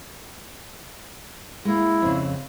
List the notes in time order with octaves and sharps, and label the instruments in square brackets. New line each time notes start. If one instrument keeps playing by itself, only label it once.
[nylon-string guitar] G#3 A#3 [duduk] E4
[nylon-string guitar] F2 C#3